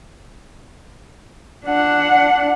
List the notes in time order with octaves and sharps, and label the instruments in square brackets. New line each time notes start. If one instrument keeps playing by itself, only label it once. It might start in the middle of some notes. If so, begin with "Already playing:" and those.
[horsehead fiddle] D4 F#5